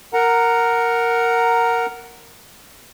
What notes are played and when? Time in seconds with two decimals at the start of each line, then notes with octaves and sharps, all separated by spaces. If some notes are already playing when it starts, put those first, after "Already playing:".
0.14 A#4 F#5 A#5